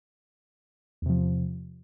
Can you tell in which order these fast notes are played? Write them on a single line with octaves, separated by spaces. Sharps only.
E2 C3 F3